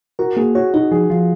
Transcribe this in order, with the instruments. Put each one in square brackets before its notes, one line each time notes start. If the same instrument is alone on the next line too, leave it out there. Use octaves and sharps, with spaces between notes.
[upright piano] F#4 [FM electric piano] A#4
[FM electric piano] A#3 [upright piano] G#4
[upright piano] F#4 [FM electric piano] C#5
[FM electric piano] D#4 [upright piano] F#4
[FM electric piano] F3 [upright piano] G#4
[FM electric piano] F3 [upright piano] F4